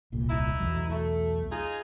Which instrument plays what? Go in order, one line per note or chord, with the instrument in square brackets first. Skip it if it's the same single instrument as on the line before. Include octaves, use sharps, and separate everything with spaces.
[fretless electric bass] D#1 C2 A#2
[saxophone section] D#4 E4
[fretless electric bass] B1 E2 F#3
[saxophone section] A3
D#4 F4 G#4